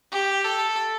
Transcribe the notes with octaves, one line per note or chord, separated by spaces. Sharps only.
G4
A4